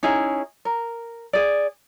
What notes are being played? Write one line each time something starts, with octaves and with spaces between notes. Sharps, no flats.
C#4 D#4 E4 G#4
A#4
G#4 D5